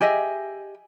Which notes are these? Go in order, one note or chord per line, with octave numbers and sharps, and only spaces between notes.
G4 G#4 D#5 E5